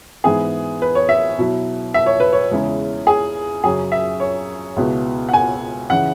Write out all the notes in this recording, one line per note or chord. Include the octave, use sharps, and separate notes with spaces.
G#2 E3 B3 E4 G#4
B4
C#5
E5
B2 F#3 E4
E5
C#5
B4
C#5
E2 C#3 G#3 C#4 E4
G#4
F#2 C#3 F#3 G#4
E5
C#5
C#2 B2 B3 E4
F#5
G#5
C#3 E3 F#5